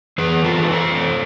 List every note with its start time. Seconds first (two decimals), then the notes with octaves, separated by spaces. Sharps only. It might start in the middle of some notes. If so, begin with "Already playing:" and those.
0.18 E3 G#4 B4
0.44 F4 A4
0.57 E3 B4
0.70 F4 A4
0.97 A3